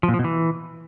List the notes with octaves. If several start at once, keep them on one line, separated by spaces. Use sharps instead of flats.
F3
A#2
F3
B2
E3